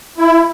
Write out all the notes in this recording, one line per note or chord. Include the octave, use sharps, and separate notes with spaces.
E4